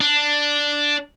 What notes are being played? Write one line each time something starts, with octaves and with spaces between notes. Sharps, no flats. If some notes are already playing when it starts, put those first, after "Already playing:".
D4